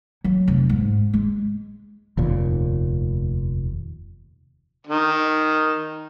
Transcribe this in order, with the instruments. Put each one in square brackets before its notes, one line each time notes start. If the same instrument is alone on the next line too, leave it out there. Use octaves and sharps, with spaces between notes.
[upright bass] F#3
F1
G#2
G#3
[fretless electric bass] F1 D#2 A#2
[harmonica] D#3